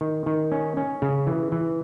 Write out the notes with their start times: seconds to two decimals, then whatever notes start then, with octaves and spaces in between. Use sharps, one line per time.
0.01 D#3
0.26 D#3
0.52 C#4
0.77 C#4
1.02 C#3
1.27 E3
1.52 E3